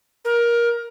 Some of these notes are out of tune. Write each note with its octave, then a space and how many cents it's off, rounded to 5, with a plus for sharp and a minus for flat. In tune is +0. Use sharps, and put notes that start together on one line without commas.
A#4 +20